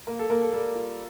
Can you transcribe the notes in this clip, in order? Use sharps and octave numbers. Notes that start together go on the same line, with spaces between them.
A#3 A#4
A4
A#3 A#4
A4
G3 A4
F4